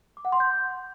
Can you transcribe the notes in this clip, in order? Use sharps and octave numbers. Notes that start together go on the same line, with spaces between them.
D6
F#5
C6
G6